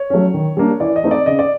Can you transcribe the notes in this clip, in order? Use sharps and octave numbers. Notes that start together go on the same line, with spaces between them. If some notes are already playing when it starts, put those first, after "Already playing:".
Already playing: C#5
F#3 A3 C#4
D#3
G3 A#3 D4
E3 D5
D#5
A3 C4 D#4
D5
C#3 D#5
D5